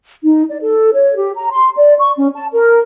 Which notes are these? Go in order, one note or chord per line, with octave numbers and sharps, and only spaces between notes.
D#4
D5
A4
C#5
G4
A#5
C6
D5
C#6
C#4
A5
A#4